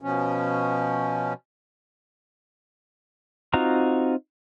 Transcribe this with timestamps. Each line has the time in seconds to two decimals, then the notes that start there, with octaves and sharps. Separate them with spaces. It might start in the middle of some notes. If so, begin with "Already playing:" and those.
0.02 B2 F3 C#4
3.53 C4 D#4 F4 F#4 A#5